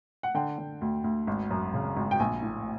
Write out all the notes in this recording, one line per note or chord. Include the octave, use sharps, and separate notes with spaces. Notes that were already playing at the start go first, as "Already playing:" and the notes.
F#5
D3 G5
D3
D2
D2
G#1
F#2
C#3
G#1
G5
A#1 G#5
A2